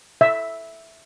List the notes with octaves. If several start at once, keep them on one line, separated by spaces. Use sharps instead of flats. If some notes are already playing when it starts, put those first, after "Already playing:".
E5